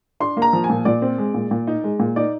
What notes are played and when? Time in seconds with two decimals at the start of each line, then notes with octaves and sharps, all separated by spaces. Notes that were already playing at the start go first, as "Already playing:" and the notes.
0.20 D4 C6
0.37 A#3
0.42 A#5
0.53 F3
0.64 G#5
0.70 A#2
0.85 A#2 D5
1.02 C4
1.18 G#3
1.34 A#2
1.51 A#2
1.67 D#4
1.84 G#3
2.00 A#2
2.16 D#4 D5